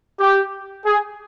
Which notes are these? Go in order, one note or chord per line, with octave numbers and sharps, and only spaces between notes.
G4
G#4